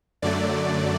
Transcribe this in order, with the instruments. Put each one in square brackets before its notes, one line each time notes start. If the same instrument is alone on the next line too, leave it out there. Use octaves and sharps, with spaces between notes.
[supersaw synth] F#2 D3 F#3 A3 D5